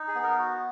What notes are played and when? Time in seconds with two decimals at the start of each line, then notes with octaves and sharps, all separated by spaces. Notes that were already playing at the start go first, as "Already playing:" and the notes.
Already playing: D#4
0.08 G#4
0.15 B3
0.23 A#4
0.39 F#4